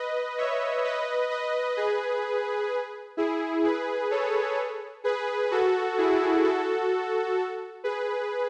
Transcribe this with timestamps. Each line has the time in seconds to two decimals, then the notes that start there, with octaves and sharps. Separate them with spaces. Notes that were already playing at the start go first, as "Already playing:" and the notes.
Already playing: B4 D#5
0.38 C#5 E5
0.85 B4 D#5
1.30 B4 D#5
1.77 G#4 B4
3.17 E4 G#4
3.64 G#4 B4
4.11 A4 C#5
5.04 G#4 B4
5.51 F#4 A4
5.98 E4 G#4
6.44 F#4 A4
7.84 G#4 B4